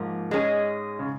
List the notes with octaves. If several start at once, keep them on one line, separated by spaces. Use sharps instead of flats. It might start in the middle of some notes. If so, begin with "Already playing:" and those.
Already playing: G#2 F3 A#3
G#3 C#4 G#4
C#3